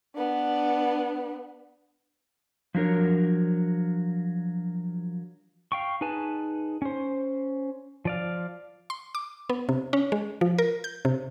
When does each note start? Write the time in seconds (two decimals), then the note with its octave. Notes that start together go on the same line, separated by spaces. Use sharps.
0.15 B3 D4
2.75 F3 F#3 D4 A#4 C#5
5.72 F5 G5 C#6
6.01 D#4 G#4 B4 G#5 A5
6.82 C#4 C5
8.05 F3 D5 F5
8.90 C6
9.15 D6
9.50 B3
9.69 C3
9.93 C#4
10.12 G#3
10.41 F3
10.58 A#4
10.84 G6
11.05 C3